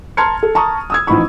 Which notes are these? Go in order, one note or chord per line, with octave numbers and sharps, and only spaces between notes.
A5 A#5 C6 F6 G#6 C#7
A4
A5 A#5 C#6 D#6
D#6 E6 G#6
A1 F3 D#4 B5 C#6